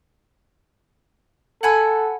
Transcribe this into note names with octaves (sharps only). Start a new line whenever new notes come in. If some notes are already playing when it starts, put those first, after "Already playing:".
A4 F#5 G#5 B5